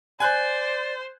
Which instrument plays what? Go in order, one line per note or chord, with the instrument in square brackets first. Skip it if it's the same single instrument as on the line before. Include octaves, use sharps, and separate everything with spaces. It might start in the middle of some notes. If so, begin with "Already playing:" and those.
[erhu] C5 [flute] D5 [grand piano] G#5 F#6 G6